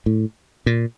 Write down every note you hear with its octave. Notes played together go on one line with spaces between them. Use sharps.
A2
A#2